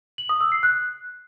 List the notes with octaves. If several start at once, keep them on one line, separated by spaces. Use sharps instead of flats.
F#7
D#6
E6
C7
F#6